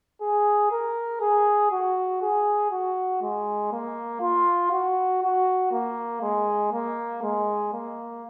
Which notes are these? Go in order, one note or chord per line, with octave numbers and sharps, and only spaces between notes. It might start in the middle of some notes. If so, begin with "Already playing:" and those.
G#4
A#4
G#4
F#4
G#4
F#4
G#3
A#3
F4
F#4
F#4
A#3
G#3
A#3
G#3
A#3